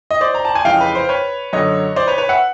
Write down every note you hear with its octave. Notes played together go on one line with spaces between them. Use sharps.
D#5
C5 D5
A#5
A5
G#5
F2 C#3 E3 G#3 F5 G5
B4
C5
B4 C#5
F#2 D3 F#3 C#5 D#5
C5 D5
B4 C#5
B4 C#5
E5 F#5